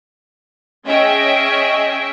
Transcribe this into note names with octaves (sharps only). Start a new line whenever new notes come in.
C#4 G#4 D#5 E5 G5